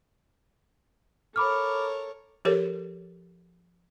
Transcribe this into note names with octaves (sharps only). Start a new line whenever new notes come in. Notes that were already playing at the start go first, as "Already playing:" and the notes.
A4 A#4 C#5 B5 D6 F6
F3 G4 A4 A#4 C#5